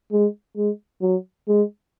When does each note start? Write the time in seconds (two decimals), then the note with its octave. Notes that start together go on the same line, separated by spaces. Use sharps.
0.12 G#3
0.56 G#3
1.02 F#3
1.48 G#3